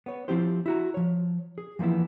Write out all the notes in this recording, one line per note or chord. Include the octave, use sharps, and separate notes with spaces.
B3 C#5
F3 C4 E4 G4 C5
E4 F#4 A#5
F3 C#5
G#4
E3 F3 A#3 B3 E4